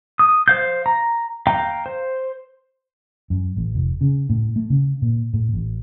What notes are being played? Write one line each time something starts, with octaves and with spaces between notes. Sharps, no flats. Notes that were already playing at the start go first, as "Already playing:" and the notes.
D#6
C5 F5 G6
A#5
F5 G5 A#5
C5
F#2
A1
F1
C#3
A2
A3
C#3
A#2
A2
A1